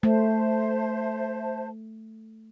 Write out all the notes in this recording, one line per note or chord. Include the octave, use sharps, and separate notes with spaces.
A3 C5 E5 A5